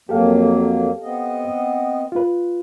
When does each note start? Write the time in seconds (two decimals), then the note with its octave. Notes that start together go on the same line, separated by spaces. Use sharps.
0.09 F2 F#3 A#3 G4 A4 F5
1.02 B3 C4 D#5
2.12 F4 B4